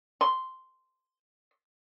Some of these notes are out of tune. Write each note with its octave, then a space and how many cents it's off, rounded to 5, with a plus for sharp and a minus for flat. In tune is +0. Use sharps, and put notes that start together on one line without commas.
C6 -5